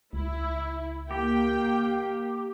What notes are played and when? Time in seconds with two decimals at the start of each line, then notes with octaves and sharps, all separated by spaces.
0.13 C#2 E4
1.11 A#3 G4 G5